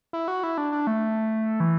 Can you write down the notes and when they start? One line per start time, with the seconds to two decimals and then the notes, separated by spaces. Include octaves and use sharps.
0.13 E4
0.28 F#4
0.43 E4
0.58 D4
0.72 D4
0.87 A3
1.60 E3